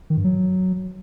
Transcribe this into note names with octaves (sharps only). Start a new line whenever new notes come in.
D#3
G2
F#3